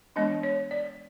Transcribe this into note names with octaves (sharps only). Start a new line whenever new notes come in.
E3 G#3 B3 D4 D#5
C#5
D5